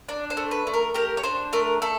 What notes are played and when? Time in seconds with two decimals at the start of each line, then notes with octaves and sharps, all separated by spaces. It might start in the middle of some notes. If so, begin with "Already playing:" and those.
0.09 D4 D5
0.30 C5
0.37 A3
0.51 B4
0.67 A3
0.74 A#4
0.94 G4 A#4
1.17 C#5
1.23 D4 C5
1.53 A3 A#4
1.82 A3 A4